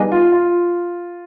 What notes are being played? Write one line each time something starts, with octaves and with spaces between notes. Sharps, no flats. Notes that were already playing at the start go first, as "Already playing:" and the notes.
Already playing: G3 B3 D#4 G#4
F4
F4